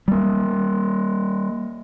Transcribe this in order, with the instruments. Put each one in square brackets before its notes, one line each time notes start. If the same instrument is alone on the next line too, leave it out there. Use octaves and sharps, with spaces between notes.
[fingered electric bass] G3 A#3